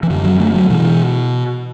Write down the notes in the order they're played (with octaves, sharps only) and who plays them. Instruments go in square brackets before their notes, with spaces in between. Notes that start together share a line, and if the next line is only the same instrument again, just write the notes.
[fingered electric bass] E3
F#2 D3
F#3
D3 A3
F#3
B2 E3